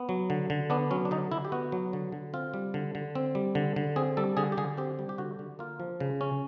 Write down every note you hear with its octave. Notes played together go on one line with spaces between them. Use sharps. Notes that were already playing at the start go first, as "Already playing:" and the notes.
Already playing: B3
F#3
D3
D3
B3 D4
F#3 C#4
D4
D3 D#4
D3 E4
G4
B3 F#4
F#3
D3
D3
C4 F4
G3
D3
D3
C4
G3
D3
D3
C4 G#4
G3 A4
D3 G#4
G4
D3 G#4
C4 G4
G3
G4
D3 F#4
D3
A#3 F4
F3
C#3
C#4